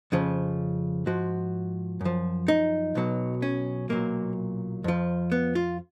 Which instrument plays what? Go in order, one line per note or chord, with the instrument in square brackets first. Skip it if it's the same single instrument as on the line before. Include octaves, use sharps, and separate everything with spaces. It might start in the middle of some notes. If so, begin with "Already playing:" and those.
[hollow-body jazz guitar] F2 C#3 F3
G#2 F3 F#4
F#2 F3
D#4
B1 B2 F#3
C#4
B1 A#2 F#3 A#3
F2 F3
B3
F4